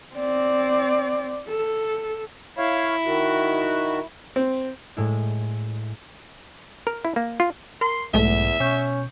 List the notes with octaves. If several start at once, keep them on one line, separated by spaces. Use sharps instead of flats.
C4 D5
A4
E4 C#5 F5
D#3 F#4
C4
A2 G#3 E4
A#4
E4
A#3
F4
A#4 C6
B1 E2 G#2 G#3 A3 E5
B2 C#4 C#6 G6